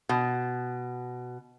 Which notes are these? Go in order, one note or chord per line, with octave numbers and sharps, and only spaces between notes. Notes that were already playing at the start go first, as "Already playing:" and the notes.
B2